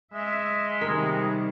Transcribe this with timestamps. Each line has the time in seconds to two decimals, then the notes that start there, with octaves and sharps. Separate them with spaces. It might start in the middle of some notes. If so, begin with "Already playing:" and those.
0.14 G#3 E5
0.81 C3 D#3 G3 A#4 C6 B6